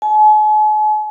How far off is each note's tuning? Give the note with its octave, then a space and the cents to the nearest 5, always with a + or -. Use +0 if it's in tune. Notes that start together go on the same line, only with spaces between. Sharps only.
G#5 +45